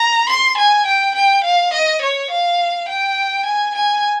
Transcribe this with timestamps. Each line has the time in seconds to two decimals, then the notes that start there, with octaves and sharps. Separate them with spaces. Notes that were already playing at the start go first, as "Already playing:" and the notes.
Already playing: A#5
0.29 C6
0.57 G#5
0.86 G5
1.15 G5
1.44 F5
1.73 D#5
2.02 C#5
2.30 F5
2.88 G5
3.45 G#5
3.75 G#5